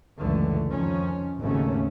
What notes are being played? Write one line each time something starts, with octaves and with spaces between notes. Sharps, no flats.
C#2 F#2 D3 E3 A3
F2 D#3 F3 C#4
G#1 D#2 G#2 C#3 A3 C#4